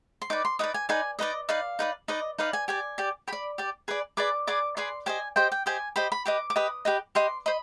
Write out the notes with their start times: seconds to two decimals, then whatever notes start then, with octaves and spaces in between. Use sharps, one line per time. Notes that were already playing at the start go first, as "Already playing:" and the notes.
0.22 C6
0.30 D#4 B4 D5 D6
0.45 C6
0.59 D#4 B4 D5 D#6
0.74 G#5
0.89 D#4 B4 D5 G#5
1.19 D#4 B4 D5 D#5
1.49 D#4 B4 D5 F5
1.79 D#4 B4 D5
2.08 D#4 B4 D5 D#5
2.38 D#4 B4 D5 F5
2.53 G#5
2.68 G4 D5 G#5
2.98 G4 D5
3.28 G4 D5 B5
3.58 G4 D5
3.88 G#4 B4 D5
4.17 G#4 B4 D5 D6
4.47 G#4 B4 D5 D6
4.77 G#4 B4 D5 C6
5.06 G4 C5 D#5 G#5
5.36 G4 C5 D#5 G5
5.52 G5
5.66 G4 C5 D#5 G#5
5.96 G4 C5 D#5 B5
6.12 B5
6.25 G4 B4 D#5 D6
6.50 D6
6.56 G4 B4 D#5 D#6
6.85 G4 B4 D#5
7.15 G4 B4 D#5 C6
7.46 C5 D#5 B5